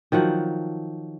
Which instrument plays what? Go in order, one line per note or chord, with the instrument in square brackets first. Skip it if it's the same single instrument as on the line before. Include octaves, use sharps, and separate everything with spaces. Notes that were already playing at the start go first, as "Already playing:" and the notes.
[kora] D#3 F3 F#3 F#5